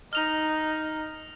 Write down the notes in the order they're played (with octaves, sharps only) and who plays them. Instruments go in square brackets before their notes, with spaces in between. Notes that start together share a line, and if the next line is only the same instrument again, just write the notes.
[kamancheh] D#4 [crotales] F6 F7